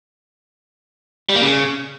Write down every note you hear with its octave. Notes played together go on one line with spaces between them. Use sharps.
G3
A#3
C#3